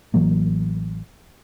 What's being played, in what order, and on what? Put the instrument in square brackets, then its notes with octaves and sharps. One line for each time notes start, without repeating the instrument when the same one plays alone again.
[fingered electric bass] A1 E3 F#3 A#3